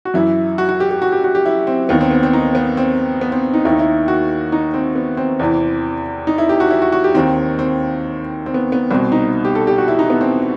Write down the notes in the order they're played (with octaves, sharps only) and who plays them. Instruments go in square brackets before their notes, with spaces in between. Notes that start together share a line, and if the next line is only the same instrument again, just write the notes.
[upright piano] F#4
F#2 E3 E4
F#4
F#4
G4
G4
F#4
G4
F#4
G4
E4
C4
D#2 D#3 B3
C4
B3
C4
D#4
B3
C4
B3
C4
D#4
D#2 D#3 E4
D#4
E4
F#4
D#4
C4
B3
C4
E2 C3 E3
D#4
E4
G4
F#4
E4
F#4
F#4
G4
D#2 D#3 C4
C4
C4
B3
B3
C2 B2 C4
D#4
G4
A4
G4
F#4
E4
D#4
B3
C4